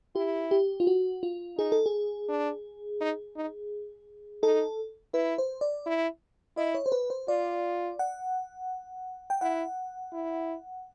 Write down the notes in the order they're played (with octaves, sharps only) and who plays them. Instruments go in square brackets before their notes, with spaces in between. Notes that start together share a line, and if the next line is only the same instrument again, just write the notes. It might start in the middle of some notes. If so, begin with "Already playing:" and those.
[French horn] E4 [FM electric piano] G4
[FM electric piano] G4
F4
F#4
F4
[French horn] D#4 [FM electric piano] G#4
[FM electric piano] A4
G#4
[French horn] D4
D#4
D#4
[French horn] D#4 [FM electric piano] A4
[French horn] E4 [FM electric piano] B4
[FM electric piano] C5
D5
[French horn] E4
[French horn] E4 [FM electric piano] D#5
[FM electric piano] C#5
C5
B4
C5
[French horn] F4 [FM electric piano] D5
[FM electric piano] F#5
G5
[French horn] E4 [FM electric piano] F#5
[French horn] E4